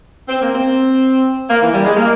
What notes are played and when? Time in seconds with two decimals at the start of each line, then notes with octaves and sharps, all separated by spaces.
0.28 C4
0.41 A#3
0.54 C4
1.49 A#3
1.62 E3
1.73 G3
1.84 G#3
1.95 A#3